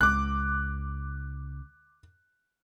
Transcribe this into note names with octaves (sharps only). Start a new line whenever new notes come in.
C#2 D6 F#6